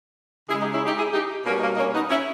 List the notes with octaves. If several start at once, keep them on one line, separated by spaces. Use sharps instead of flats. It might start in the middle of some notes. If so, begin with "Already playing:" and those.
C#3 G#3 E4 G#4
D#4 G4
C#4 E4
D#4 G4
E4 G#4
D#4 G4
B2 G3 A#3 C#4
D#4
A#3 C#4
D#4
A#3 C#4
B3 D#4
C#4 E4